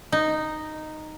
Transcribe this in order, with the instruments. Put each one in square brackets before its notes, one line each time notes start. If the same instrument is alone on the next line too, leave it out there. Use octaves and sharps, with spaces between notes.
[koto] D#4